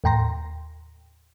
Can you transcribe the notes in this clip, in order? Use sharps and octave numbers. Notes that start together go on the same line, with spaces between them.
D#2 A2 G5 A#5 C6 A#6